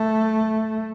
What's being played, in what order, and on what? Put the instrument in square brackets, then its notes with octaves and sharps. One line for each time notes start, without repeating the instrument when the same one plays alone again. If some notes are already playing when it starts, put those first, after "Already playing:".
Already playing: [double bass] A3